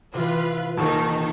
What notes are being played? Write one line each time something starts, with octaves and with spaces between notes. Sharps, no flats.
C3 E3 F4 B4
D#1 D#3 D#4 A5 C#6